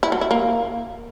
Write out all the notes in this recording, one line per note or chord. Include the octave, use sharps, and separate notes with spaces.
E4
F#3
E4
A#3